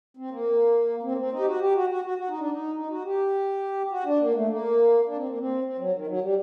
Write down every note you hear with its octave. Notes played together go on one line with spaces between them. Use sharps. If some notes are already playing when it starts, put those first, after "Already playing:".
C4
A#3
C4
A#3
C4
D#4
G4
F#4
G4
F#4
F#4
F#4
F#4
D#4
D4
D#4
D#4
F#4
G4
F#4
D4
A#3
A3
A#3
D4
C4
A#3
C4
C4
F#3
D#3
F#3
G3